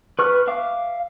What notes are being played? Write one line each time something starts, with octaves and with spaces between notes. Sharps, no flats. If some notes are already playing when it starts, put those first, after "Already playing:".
B4 C#6 F6
E5 F5 D6